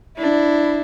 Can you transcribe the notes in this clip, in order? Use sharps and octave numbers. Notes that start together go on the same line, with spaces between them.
D4 E4